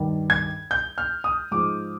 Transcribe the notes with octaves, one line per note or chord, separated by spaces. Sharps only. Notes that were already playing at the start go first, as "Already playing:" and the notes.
Already playing: G2 D#3
G#6
G6
F6
D#6
G#2 F3 D6